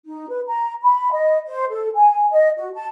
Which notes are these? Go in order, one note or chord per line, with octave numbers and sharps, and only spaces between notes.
D#4
B4
A#5
B5
D#5
C5
A4
G#5
D#5
F#4
A5